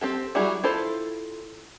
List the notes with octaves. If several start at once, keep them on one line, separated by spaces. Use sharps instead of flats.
C4 G4 A4
F#3 G3 E4 F#4 G#4
E4 F4 A4 C5